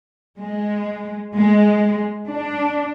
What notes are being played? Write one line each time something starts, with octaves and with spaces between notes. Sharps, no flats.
G#3
G#3
D4